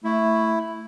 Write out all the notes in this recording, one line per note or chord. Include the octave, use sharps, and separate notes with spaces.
A3 E4